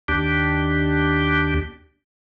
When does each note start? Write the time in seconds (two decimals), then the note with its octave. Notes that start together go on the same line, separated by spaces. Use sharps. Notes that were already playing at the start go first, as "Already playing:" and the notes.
0.08 D#2 D4 G4